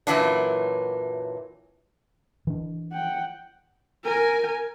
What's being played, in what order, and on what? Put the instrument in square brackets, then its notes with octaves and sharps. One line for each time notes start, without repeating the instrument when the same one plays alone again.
[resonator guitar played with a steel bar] F#2 A#2 E3 F#3 D4
[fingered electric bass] E3 D4
[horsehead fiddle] F#5 G5
A#4 G#5